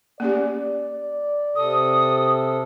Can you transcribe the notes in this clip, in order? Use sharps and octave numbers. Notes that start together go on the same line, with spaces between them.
A#3 C#4 G4 D5
C3 A4 D#6